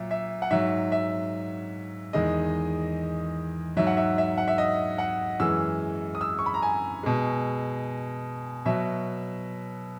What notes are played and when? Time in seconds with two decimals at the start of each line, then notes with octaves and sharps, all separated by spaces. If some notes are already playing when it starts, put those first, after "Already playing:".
Already playing: A#2 F#3 E5
0.11 E5
0.42 F#5
0.51 G#2 F#3 E5
0.92 E5
2.13 E2 D#3 G#3 D#5
3.77 G#2 F#3 E5
3.87 F#5
3.97 E5
4.18 E5
4.38 F#5
4.48 E5
4.58 D#5
4.98 F#5
5.40 F#2 E3 G#3 E6
6.15 D#6
6.21 E6
6.39 C#6
6.46 B5
6.54 A#5
6.62 G#5
7.03 B2 G#3
8.65 B2 F#3 E5